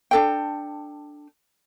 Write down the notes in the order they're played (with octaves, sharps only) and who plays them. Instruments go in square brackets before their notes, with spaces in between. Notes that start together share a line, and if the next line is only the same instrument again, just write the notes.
[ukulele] D4 A4 G5